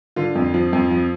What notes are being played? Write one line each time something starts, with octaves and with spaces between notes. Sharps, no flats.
D3 F4
F2
F3
F2
F3